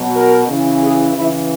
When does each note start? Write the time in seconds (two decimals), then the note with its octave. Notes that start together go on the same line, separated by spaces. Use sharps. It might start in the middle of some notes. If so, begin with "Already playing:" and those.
Already playing: B2 F#3
0.14 A#4
0.48 C#3 E3
0.81 G#4
1.14 C#3 E3 E4